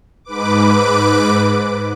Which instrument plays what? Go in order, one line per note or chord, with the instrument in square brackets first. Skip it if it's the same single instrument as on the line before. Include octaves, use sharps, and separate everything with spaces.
[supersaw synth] G#2 B4 D6